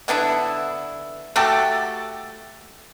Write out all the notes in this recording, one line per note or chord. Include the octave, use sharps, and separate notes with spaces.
D3 B3 D4 E4
A3 F#4 G4 A4